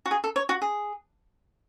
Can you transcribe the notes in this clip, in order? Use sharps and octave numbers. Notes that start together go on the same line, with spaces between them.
F#4
G#4
A4
C#5
F#4
G#4